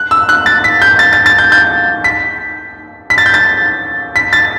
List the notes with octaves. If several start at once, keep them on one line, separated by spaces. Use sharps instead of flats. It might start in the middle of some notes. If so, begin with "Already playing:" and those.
Already playing: F#6
E6
F#6
A6
B6
G6
A6
A6
A6
G6
G6
B6
B6
A6
G6
A6
B6
A6